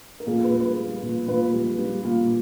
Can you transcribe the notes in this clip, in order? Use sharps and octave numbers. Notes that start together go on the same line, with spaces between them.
A#4
A#2 G#4
B4
G3
B4
G3
A#2
A#2 B4
G3
G3
A#2